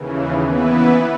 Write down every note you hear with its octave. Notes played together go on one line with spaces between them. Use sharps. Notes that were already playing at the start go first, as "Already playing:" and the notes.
Already playing: D#2 C#3 E3
E3 B3 E4 B4